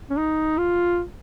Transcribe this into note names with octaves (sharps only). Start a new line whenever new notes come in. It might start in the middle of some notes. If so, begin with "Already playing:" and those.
C#4
D#4
F4